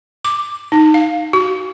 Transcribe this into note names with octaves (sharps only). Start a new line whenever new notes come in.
D6
D#4
F5
F#4